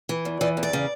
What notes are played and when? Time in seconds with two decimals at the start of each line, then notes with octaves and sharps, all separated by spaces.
0.09 E3
0.25 E2
0.41 E3 D5
0.57 E2
0.63 D5
0.73 C#3